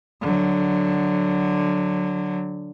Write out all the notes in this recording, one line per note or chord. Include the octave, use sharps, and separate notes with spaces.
D3 F#3